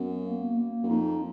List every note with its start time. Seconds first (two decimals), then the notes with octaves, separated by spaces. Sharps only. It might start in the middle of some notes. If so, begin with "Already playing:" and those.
Already playing: F#2 B3
0.25 A#3
0.57 A#3
0.83 F#2
0.88 F2 D#4